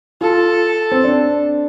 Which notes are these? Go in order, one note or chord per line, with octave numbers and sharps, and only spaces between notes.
F4 A4
C4
D4